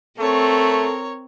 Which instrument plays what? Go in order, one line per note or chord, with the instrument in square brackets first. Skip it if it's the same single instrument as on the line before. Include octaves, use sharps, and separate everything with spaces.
[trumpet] A3 [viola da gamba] C4 [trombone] A4 [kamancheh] A#4 C#5